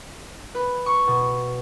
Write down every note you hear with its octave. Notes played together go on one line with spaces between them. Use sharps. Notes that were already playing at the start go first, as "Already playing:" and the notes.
B4
C#6
B2